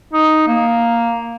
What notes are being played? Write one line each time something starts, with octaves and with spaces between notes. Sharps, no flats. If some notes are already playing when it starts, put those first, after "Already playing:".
D#4
A#3